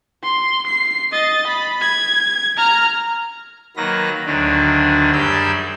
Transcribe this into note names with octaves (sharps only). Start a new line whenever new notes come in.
C6
C7
D#5 A6
B5
G#6
A#5 F6
D#3 F#3 A#3 B4 A#6
D2 D3 D#3 F#3 D4
F#2 G3 G#4 D5 E6 G6